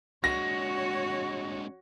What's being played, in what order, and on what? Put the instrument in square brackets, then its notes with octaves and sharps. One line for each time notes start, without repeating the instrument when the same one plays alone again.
[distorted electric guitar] D3 G#3 [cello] F#4 C#5 [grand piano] A#6